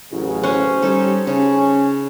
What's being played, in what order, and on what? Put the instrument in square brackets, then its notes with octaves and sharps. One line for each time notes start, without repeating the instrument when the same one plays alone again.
[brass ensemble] A1 C#3 F#3
[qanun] C#4 C5
[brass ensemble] G3 C#4 G4 [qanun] D#4 A4
[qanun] C#3 [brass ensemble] C#4